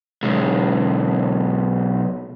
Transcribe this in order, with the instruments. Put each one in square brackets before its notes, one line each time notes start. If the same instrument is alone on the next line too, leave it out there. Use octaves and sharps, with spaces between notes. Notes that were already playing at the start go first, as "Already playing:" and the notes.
[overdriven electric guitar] B1 G#3